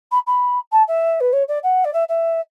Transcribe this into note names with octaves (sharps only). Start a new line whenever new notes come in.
B5
B5
A5
E5
B4
C#5
D5
F#5
D5
E5
E5